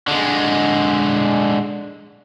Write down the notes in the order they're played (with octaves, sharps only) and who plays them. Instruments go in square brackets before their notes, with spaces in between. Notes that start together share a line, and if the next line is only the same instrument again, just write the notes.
[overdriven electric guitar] D3 G#3